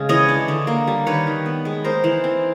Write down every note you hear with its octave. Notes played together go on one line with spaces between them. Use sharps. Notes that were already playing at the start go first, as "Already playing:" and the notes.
Already playing: C#3 G#3
E3 C#5 D#5
D4
D3
A#3
G3
D#3 B4 C#5
D#3
B3
G#3
D#4 A#4 C5
E3
C4